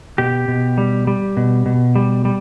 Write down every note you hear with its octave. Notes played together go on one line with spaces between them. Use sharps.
B2 G4
B2
G3
G3
B2
B2
G3
G3